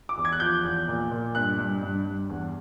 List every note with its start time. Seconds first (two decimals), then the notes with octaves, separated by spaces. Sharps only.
0.09 D6
0.17 E2
0.25 G#6
0.32 F#6
0.40 F3 G6
0.64 E2
0.88 A#2
1.11 A#2
1.35 G2 F#6
1.58 G2
1.83 G2
2.05 G2
2.30 E2